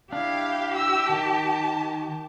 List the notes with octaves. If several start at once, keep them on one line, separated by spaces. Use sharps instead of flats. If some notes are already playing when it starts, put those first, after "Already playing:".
D4 E4 G4 F5
E6
D#3 A5